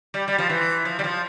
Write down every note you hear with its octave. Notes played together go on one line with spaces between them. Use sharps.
G3
G3
F3
E3
F3
G3
F3